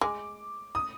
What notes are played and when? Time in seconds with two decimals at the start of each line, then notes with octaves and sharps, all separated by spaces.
0.01 G#3 D6
0.75 D#6